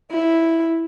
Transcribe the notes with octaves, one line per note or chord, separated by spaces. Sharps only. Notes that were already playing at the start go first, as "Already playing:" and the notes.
E4